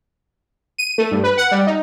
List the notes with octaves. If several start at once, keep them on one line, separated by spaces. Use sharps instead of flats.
D#7
A3
G2
B4
F#5
G3
D#4